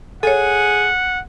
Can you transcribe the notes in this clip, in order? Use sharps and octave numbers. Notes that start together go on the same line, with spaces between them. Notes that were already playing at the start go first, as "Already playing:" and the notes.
G#4 A4 C#5 F#5